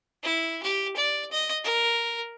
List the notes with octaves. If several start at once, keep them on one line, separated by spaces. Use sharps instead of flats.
E4
G4
D5
D#5
A#4